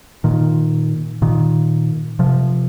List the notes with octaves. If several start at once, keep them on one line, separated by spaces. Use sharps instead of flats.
A#2 D#3
A#2 D#3
C3 F3